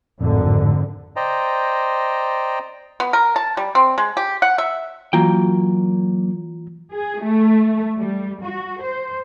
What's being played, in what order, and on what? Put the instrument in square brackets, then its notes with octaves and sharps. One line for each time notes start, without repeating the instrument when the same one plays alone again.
[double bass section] G#1 D3 [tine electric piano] F2 A2
[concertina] C5 D5 D#5 G5 A#5
[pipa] B3
A#4
A5
G3
C4
G#3
G4
F#5
E5
[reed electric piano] E3 F4 A#5 [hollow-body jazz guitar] F#3 A#3 G5
[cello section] G#4
A3
G3
F#4
C5